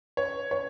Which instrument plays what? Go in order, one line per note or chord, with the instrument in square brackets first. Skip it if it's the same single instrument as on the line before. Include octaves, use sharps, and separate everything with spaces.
[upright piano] C#5
C#5